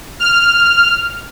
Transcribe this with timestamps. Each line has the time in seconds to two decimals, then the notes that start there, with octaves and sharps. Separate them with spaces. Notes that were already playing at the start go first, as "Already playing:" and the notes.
0.19 F6